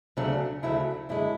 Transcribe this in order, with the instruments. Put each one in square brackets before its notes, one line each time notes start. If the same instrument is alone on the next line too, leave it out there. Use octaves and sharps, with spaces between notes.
[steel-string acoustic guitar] D2 C#3 F#3 A3 D4
D2 C#3 F#3 A3 E4
F#2 D3 G#3 E4